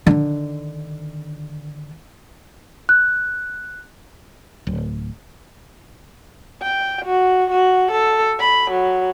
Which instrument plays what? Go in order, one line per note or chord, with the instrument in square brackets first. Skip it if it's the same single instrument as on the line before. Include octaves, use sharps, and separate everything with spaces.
[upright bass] D3 D#3
[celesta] F#6
[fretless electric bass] D1
[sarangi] G5
F#4
F#4
A4
B5
F#3